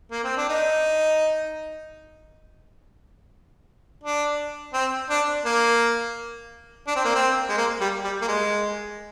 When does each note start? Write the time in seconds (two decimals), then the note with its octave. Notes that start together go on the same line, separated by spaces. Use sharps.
0.11 A#3
0.24 C4
0.37 D4
0.49 D#4
4.04 D4
4.74 C4
5.10 D4
5.46 A#3
6.87 D4
6.96 C4
7.05 A#3
7.15 C4
7.49 G#3
7.57 A#3
7.81 G3
8.04 G3
8.22 A#3
8.28 G#3